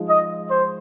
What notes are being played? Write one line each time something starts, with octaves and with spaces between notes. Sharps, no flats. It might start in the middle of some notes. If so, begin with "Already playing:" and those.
Already playing: F3 G#3 D#4
D#5
C5